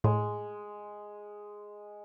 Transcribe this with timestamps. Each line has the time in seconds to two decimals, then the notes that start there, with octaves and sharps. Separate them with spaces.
0.04 A2 G#3